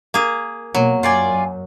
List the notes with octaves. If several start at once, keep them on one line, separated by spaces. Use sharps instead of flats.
A#3 G#4
B2 F#3 A#3
F#2 F4 D5 G#5